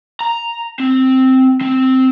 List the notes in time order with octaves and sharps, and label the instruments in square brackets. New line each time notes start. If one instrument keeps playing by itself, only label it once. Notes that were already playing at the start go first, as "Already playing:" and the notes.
[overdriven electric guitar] A#5
C4
C4